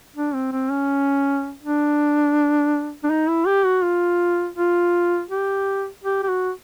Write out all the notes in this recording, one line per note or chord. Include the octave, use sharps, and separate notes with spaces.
D4
C4
C4
C#4
D4
D4
D#4
E4
G4
F#4
F4
F4
G4
G4
G4
F#4